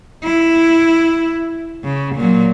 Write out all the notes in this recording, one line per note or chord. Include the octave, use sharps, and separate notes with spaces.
E4
C#3
A#2 F#3